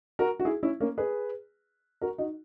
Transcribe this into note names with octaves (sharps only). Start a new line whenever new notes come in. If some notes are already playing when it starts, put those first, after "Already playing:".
F#4 A#4
F#4
E4 G#4
C#4 E4
A#3 C#4
G#4 B4
F#4 A#4
D#4 F#4